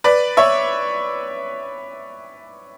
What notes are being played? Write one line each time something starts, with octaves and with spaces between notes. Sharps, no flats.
B4 D5
C#5 E5